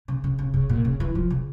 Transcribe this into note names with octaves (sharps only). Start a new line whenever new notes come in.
C#3
C#3
C#3
C#3
A#2
C#3
E3
F3
C#3